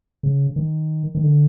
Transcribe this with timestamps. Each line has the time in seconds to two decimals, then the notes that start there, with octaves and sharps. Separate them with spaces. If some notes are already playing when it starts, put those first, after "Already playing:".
0.23 C#3
0.56 D#3
1.15 D#3
1.23 D3